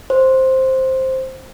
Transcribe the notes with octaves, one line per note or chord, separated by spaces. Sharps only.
C5